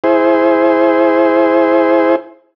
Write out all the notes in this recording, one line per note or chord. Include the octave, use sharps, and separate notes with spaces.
E4 G#4 C5